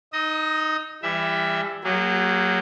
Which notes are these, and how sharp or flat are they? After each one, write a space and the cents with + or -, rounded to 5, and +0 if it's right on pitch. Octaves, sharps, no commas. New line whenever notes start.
D#4 +0 D#5 +0 D#6 +35
E3 +30 G3 +30 E5 +0
F#3 +10 A#3 -15 G#4 -35